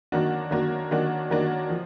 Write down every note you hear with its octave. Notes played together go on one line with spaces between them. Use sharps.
D#3 F#3 A#3 D4 F#4
D#3 F#3 A#3 D4 F#4
D#3 F#3 A#3 D4 F#4
D#3 F#3 A#3 D4 F#4
F3